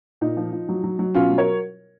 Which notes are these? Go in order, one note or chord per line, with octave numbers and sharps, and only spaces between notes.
A#2 D#4
F3
F3
F#3
F#3
F#3
B2 C#4 F4
F#3
A#4 C#5